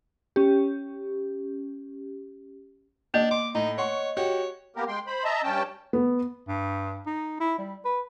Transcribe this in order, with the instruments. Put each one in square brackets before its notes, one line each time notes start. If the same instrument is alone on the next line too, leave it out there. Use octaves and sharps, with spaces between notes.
[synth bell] C#4 G4
[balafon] A#3 [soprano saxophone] D4 [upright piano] D#5
[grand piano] C6 [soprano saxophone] D6
[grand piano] A2 [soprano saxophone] D#4
[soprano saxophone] C#5 [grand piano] F#5 C6 C#6
[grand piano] F#4 G4 [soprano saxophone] C#5
[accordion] A#3 B3 G4 A#4
G#3 G5 C6
C5 B5
D#5 E5 A5 A#5
G2 C#4 G5 A5
[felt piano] B3
[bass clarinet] G2
D#4
E4
G3
B4